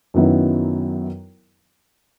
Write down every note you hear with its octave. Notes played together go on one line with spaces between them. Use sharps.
F#2 D#3 F#3 B3 E4